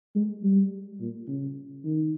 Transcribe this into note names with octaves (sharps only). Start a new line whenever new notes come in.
G#3
G3
A#2
C#3
D#3